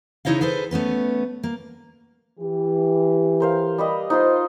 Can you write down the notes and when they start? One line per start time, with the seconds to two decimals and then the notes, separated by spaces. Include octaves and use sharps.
0.25 C#3 D#4 E4 C#5 D#5 F5
0.41 G#4 A4 B4 C5
0.71 A3 B3 C#4 B4
1.43 A#3
2.40 E3 G4
3.40 A#4 C5 F5
3.78 G3 B4 D#5
4.10 D#4 F4 C5 C6